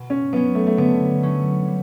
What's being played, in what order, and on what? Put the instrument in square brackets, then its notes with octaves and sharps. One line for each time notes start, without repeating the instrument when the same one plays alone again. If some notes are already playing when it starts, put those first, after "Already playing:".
Already playing: [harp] B2
[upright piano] C#4
[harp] F#3 [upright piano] B3
[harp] C#4
[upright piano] A3
A3
[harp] D3 [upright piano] B3
[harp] F#3 A3 C#4
G3